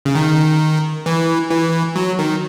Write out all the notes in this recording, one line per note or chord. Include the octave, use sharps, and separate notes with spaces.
C#3
D#3
E3
E3
F#3
D#3